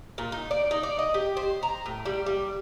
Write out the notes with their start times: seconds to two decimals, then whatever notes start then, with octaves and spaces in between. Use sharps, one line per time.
0.18 A#2
0.32 D#4
0.51 D5
0.71 D#4
0.83 D5
0.99 D#5
1.14 G4
1.37 C5
1.63 A#5
1.86 A2
2.06 G3
2.26 G3